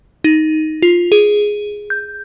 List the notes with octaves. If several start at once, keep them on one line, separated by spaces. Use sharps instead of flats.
D#4
F4
G#4
G6